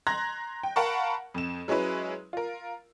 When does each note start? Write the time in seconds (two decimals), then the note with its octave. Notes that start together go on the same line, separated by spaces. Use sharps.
0.07 A#5 C6 F#6 G#6 A#6
0.63 G5
0.76 A#4 F5 F#5 A5 B5 C#6
1.34 F2 E7
1.68 F#3 G#3 C#4 E4 B4
2.33 F4 A#4